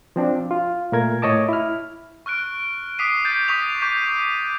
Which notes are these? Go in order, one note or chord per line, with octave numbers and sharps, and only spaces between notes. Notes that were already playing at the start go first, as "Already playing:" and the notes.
F3 C4 D4
F4
A#2 A3 A#4 G#6
A2 C#5 D#5 A5 D6
E4 F6
C#6 F6 F#6 D7
D6 D#6 B6 C7 D7 D#7
G6 A6 D#7
C#6 D#6 B6 F7
C#6 D6 G6 D#7